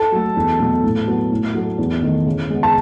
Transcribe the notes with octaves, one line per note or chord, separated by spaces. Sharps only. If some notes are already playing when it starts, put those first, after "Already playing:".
Already playing: A4 A5
F#3 A3
E2
B2 F#3 A3
A2
F#3 B3
A2
F#3 A3
E2
D#3 A3
C#3
G#3 B3
A5